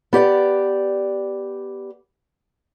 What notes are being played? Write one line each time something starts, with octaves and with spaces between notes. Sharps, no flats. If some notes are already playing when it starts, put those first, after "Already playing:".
B3 G4 D5 G5